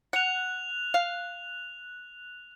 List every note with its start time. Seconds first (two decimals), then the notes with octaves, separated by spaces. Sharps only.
0.13 F#5 F#6 F7
0.94 F5